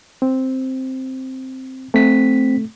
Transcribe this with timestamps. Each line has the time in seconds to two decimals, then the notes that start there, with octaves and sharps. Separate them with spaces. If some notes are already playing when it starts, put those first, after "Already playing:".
0.22 C4
1.94 A3 C4 B6